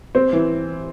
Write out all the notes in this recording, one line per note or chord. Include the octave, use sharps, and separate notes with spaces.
C4
E3